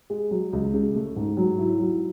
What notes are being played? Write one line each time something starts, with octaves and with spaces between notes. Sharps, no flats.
G#3
F#3
C#2
C#3
A3
G#2
F#3
E4
F#3